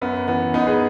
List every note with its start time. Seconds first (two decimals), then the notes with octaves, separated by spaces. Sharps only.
0.01 F#2 B3
0.28 E3 B3
0.54 F#2 B3 D#4
0.67 G#4 B4